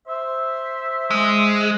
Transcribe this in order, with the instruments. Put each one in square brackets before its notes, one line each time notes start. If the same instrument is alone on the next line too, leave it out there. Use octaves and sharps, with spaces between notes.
[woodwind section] C5 E5
[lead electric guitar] G#3